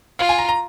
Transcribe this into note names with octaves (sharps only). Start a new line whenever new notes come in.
F4 F5
G#5
A#5
A#5